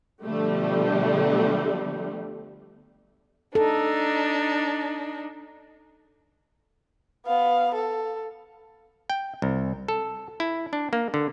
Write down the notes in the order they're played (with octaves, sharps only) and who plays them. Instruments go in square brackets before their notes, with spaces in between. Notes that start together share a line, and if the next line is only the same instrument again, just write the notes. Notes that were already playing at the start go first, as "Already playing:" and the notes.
[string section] B2 D3 F3 G3 A3
[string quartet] D4 D#4 [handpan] A4
[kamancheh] B3 F5
A4
[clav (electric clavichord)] G5
C2
A4
E4
D4
A#3
D3